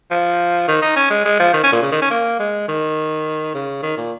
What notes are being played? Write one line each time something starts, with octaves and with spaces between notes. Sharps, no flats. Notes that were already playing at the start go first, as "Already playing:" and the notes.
F3
D#3
D#4
C#4
G#3
G#3
F3
D#3
C#4
A#2
C#3
D#3
C#4
A#3
G#3
D#3
C#3
D#3
A#2